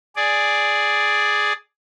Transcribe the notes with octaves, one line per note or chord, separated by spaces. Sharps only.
G#4 D5